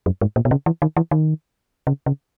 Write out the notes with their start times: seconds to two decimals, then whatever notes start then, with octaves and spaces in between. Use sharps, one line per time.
0.06 F#2
0.21 G#2
0.36 A#2
0.45 B2
0.51 C#3
0.66 E3
0.82 D#3
0.97 E3
1.11 D#3
1.87 C#3
2.06 C#3